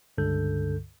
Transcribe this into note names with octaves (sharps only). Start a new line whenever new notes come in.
C#2 G2 D3 A4 G6